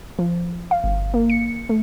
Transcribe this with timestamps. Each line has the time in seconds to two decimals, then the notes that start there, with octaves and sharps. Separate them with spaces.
0.19 F3
0.71 F5
0.84 G1
1.14 A#3
1.30 C#7
1.69 A3